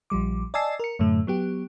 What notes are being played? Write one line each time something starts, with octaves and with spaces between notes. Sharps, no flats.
A#1 F3 G3 D6
D5 D#5 G#5 A5 E6 C7
A#4 C#7
F#2 A2 D3 A3
F#3 B3 G4